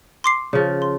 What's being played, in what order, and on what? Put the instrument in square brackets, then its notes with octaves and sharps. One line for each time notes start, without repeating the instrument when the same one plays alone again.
[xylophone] C6 D6 C7
[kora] C#3 F3
[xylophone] C6